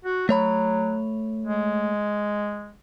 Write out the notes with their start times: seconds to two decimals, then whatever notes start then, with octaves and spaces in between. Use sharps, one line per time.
0.05 F#4
0.29 F#3 A3 C#5 B5
1.46 G#3